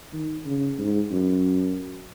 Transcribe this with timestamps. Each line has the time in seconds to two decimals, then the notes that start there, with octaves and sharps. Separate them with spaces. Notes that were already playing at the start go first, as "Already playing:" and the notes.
0.13 D#3
0.45 C#3
0.78 G#2
1.10 F#2